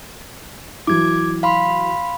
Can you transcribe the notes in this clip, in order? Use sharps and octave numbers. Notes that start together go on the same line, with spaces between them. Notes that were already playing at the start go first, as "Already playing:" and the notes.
E3 F#3 D6 G#6
F5 B5 C6